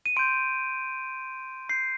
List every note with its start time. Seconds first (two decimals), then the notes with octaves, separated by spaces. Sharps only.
0.06 D#7
0.17 C6 G6 D7
1.69 C6 G6 C7